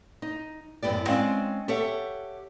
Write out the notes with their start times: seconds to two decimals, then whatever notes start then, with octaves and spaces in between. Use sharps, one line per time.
0.22 D#4
0.83 F#2 A2 B3 G4 D5
1.07 G#3 C4 C#4 D5 F5
1.68 G4 A4 C#5 E5 F#5